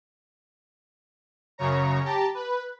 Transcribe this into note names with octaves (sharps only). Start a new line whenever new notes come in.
F#2 C#3 C#5 A#5
G4 A5 A#5
B4